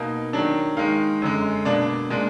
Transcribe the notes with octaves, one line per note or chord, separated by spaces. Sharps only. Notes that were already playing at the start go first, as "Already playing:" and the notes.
Already playing: B2 A#3 D#4
D#3 F#3 D4
D#3 G#3 D#4 F5
F#2 D3 G#3
B2 A#3 D4 D5
A#2 G#3 D4